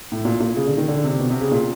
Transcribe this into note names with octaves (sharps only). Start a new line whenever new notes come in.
A2
A#2
A#2
C#3
D3
D#3
D3
C3
B2
C3
C#3
A#2